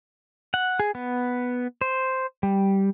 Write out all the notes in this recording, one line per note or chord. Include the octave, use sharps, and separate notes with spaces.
F#5
G#4
B3
C5
G3